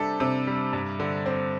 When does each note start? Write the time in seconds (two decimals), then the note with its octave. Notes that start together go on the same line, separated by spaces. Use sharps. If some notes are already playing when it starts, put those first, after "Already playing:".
Already playing: C3 G3 D4 A4
0.20 C3
0.47 G3
0.73 G2
1.00 D3
1.26 C4